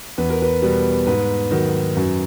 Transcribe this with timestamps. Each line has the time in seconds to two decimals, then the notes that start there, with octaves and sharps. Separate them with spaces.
0.18 E2 B4
0.30 A#4
0.42 B4
0.62 B2 G3 B3
1.07 G#2 B4
1.51 D#3 F#3
1.96 F#2